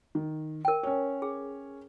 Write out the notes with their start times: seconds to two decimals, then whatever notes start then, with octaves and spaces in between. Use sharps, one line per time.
0.15 D#3
0.65 A#4 G5
0.83 C#4 C#5
1.22 G#4